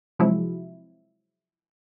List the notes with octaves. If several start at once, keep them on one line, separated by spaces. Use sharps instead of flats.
C3 F3 F#3 G#3 E4